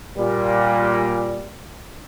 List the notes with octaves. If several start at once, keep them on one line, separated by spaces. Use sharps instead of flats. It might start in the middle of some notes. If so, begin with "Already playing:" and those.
A#2 G3